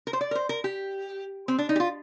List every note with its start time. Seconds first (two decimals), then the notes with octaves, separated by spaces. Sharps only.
0.07 A#4
0.13 C5
0.21 D5
0.31 A#4
0.35 C5
0.49 A#4
0.64 G4
1.48 C4
1.58 D4
1.69 D#4
1.76 G4
1.80 F4